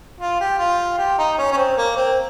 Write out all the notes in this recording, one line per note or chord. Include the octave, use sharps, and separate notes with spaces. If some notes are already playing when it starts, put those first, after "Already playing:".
F4
G4
F4
G4
D#4
C#4
C#4
C4
A#3
C4